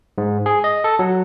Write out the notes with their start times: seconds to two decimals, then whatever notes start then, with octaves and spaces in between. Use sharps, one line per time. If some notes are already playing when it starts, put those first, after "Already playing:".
0.18 G#2
0.46 G#4
0.64 D#5
0.84 A4
0.99 F#3